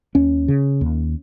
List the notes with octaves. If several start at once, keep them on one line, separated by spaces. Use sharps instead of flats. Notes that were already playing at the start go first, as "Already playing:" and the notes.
D#2 C#4
C#3
D#2